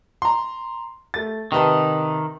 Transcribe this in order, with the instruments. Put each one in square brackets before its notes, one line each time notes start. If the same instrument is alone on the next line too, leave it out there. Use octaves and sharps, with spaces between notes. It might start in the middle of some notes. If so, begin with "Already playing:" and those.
[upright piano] A#5 C6
A3 A6
[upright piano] C3 B4 A5 [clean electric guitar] D#3